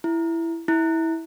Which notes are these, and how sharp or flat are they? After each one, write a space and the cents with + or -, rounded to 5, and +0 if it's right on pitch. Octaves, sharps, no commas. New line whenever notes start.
E4 +10
E4 -20